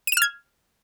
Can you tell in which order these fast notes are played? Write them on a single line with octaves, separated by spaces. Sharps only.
D#7 E7 F6 G#6